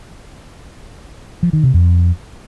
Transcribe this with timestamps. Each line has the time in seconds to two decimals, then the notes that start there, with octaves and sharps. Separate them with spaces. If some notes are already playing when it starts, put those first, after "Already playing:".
1.43 F3
1.53 D#3
1.63 C3
1.74 F2